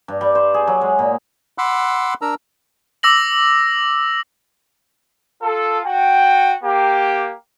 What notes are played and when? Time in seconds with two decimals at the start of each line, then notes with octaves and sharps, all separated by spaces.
0.08 G2
0.21 G3
0.35 C5
0.54 G#4
0.67 F#3
0.81 G#3
0.99 A#2
1.58 F#5 B5 C6 D6 E6 F#6
2.22 D4 A#4 A#5 E6
3.03 D6 E6 A#6 F#7
5.42 F4 A4
5.84 F#4 G5
6.63 A#3 G4